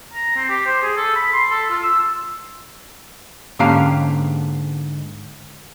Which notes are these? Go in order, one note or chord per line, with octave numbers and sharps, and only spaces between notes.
A#5
C4
G4
C5
G#4
A4
B5
C6
A4
F4
E6
G#2 D3 A#3 C#4 G4 F5